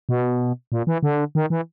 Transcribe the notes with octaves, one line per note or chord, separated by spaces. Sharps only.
B2
A#2
E3
D3
D#3
E3